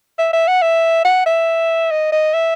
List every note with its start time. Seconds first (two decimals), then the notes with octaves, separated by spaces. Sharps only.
0.19 E5
0.33 E5
0.48 F#5
0.62 E5
1.05 F#5
1.26 E5
1.91 D#5
2.12 D#5
2.34 E5